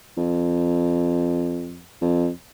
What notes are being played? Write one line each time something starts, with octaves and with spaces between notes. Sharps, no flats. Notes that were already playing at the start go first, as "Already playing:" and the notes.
F2
F2